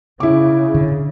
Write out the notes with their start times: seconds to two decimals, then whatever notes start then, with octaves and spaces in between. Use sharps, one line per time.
0.20 C#3 E4 D6
0.75 D3